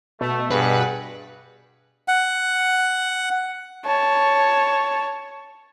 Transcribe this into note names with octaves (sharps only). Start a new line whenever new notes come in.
B2 A3
G2 G#4 B4 F#5
F#5
C#5 A5